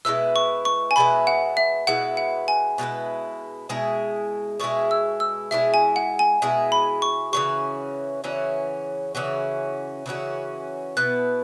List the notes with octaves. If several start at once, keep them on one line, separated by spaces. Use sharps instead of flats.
B2 G#3 E4 B4 E6
C#6
C#6
G#5
B2 G#3 E4 B4 B5
F#5
E5
B2 G#3 E4 B4 F#5
F#5
G#5
B2 G#3 E4 B4
B2 G#3 E4 G#4
B2 G#3 E4 G#4 C#6
E6
E6
B2 G#3 E4 G#4 E5
G#5
F#5
G#5
B2 G#3 E4 G#4
B5
C#6
C#3 E3 C#4 F#4 C#6
C#3 E3 C#4 F#4
C#3 E3 C#4 F#4
C#3 E3 C#4 F#4
B2 B3 E4 B4 F#6